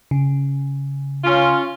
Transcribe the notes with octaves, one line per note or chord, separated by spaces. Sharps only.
C#3
C#4 F4